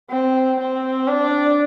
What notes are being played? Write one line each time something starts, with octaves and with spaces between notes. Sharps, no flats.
C4
C4
D4